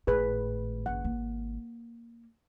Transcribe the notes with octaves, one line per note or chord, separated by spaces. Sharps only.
G#1 A2 G#4 B4
F#1 F#5
A#3